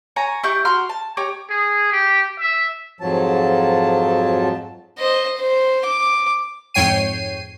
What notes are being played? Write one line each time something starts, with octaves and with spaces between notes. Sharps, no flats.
C#5 G#5 A#5
E4 G4 C#6 G6
F#4 A#5 C6 F6
A5
G4 C#5 A#5
G#4
G4
E5
F2 G#2 F3 F#3 A5
C5 D#5
C5
D6
F2 G#2 C#5 G5 C7 D#7